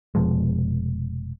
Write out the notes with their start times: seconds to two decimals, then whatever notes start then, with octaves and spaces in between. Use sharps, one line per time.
0.15 F1 B2 F3 G#3